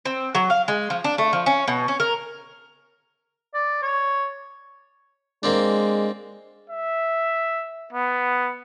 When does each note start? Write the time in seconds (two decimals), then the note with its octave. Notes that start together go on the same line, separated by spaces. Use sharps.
0.05 C4
0.35 F#3
0.50 F5
0.68 G#3
0.90 F3
1.04 D4
1.18 A3
1.33 F3
1.46 C#4
1.68 B2
1.88 C#4
2.00 A#4
3.54 D5
3.82 C#5
5.43 G#3 A#3 C4 D4
6.70 E5
7.93 B3